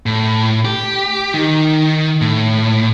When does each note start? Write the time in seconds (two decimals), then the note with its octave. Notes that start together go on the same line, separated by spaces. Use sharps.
0.06 A2
0.65 G4
1.34 D#3
2.21 A2